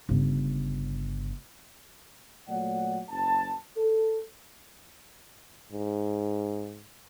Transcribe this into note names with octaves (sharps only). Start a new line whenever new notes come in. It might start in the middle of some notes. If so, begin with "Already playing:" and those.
G1 C#3
A#2 F#3 A3 C#5 D5 F#5
F#1 A5
A4
G#2